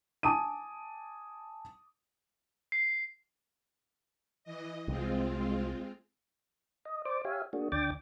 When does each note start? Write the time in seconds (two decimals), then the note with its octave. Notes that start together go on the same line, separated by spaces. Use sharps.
0.23 G#5 A5 D6 D#6 D#7
2.72 C7
4.44 E3 D#5
4.88 C2 G#3 C4 F4
6.85 D#5
7.05 C5 D5 D6
7.25 G4 C#5 E5 F5 G#5
7.53 A#3 D4 F#4 G#4
7.72 D2 D4 G5 D6 A6